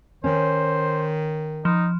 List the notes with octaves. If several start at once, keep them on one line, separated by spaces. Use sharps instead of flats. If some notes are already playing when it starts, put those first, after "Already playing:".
D#3 C#4 C5
F3 D#4